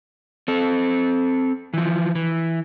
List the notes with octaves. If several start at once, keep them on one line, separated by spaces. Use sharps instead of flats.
C4 A4
E3 F3
E3